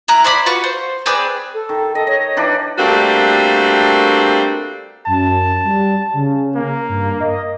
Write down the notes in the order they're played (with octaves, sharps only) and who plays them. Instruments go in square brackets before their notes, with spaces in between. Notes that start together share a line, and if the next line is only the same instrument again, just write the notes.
[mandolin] E4 A#5 F#6
C5 D5 E5 B5
F4 F#4 B4 C#6
C5
C4 G#4 B4 D5
[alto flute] A4
[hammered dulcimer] D#3
[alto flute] A4 [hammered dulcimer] D#5
[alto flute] C#5 [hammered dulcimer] D#5
[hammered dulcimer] E3 D4 D#4
[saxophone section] G3 A3 A#3 C4 D4 F#4
[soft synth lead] F#2 [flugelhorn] A5
[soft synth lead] G3
C#3
[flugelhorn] A#3
[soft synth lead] G2
D#5